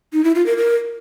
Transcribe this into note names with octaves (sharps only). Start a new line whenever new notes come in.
D#4
E4
F4
A#4
A#4